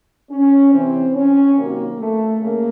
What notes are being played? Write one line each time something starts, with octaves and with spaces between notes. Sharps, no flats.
C#4
C3 E3 C4
C#4
C3 D#3 F#3 A#3
A3
C#3 A#3